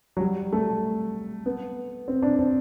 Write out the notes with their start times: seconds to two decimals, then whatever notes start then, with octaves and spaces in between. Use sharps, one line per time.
0.17 F#3
0.20 G3
0.53 A3
1.46 B3
2.08 C4
2.22 D4
2.39 C4